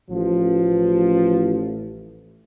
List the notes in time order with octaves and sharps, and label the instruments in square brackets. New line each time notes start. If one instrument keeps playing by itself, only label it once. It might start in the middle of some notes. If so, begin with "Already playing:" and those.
[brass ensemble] A1 [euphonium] F3